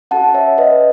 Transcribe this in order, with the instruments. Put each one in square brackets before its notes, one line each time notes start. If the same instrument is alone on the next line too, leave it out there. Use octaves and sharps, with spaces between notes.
[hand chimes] C#4 F#4 A4 F#5 A5
C#5 E5
B4 D#5